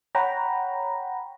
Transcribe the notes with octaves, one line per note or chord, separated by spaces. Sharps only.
C#5 F#5 G5 A#5 B5